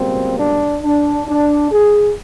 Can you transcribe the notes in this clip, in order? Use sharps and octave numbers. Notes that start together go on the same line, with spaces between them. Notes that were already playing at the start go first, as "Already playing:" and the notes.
Already playing: C#2 B2 G3 A#3 C4
D4
D4
D4
G#4